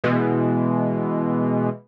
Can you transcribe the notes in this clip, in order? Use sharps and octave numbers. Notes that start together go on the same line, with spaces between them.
B2 E3 G#3